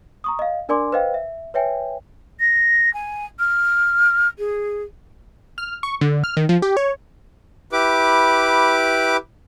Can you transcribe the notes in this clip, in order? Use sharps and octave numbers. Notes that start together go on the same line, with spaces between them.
A#5 C#6 D#6
D#5 F5
D4 A#4 D5 G#5 C6 D6
B4 C5 D#5 F5 G5
E5
B4 C#5 E5 G5 G#5
A#6
G#5
F6
G#4
F6
C#6
D3
F6
D#3
F3
G4
C#5
E4 G4 B4 D6